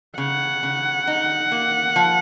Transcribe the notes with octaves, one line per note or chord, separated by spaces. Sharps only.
C#3 F#5
C#3
D#4
A#3
F3